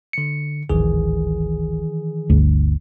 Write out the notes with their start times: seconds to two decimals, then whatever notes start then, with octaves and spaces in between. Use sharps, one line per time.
0.13 D3 C#7
0.70 D1 G#1 D#3 E3 G#4
2.30 G1 D2